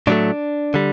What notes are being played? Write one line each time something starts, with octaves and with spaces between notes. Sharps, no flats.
A2 F#3 A3 D4
D3 G3